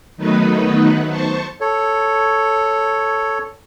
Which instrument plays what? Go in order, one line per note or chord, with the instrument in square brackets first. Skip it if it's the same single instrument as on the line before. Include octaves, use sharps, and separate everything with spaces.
[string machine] D#3 F#3 A3 B3 D#4 B4
C5 A5 C#6
[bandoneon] A4 C#5